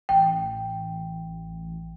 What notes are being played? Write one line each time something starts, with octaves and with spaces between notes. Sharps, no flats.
A1 G5